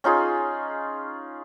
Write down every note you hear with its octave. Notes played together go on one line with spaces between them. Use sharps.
C#4 D#4 F4 G#4